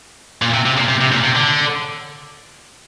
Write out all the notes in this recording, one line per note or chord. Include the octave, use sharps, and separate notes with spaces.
A#2
C3
C3
A#2
C3
C3
A#2
C3
D3